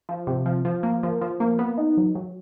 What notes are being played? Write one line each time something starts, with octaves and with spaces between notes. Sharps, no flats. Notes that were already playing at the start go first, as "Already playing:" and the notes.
F3
C3
F3
F3
A#3
F3
F3
A#3
B3
D#4
F#3
F#3